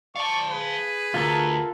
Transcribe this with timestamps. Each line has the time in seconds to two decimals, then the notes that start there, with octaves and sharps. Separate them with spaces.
0.16 D5 F5 A5 C#6
0.49 G#4 B4
1.14 D2 F4 A4 A#4